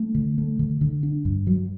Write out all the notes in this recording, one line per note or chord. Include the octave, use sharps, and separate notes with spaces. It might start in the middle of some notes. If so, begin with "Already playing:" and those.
Already playing: A3
D3
A3
D3
D3
D4
G2
F#3